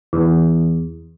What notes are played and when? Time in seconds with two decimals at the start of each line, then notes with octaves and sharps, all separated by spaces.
0.13 E2